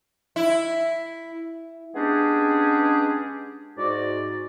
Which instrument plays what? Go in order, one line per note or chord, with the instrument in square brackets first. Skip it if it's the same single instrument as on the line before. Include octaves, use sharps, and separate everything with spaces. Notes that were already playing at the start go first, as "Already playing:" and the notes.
[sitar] E4
[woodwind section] G#3 B3 C#4 D4 G4 G#4
G#2 F#4 D5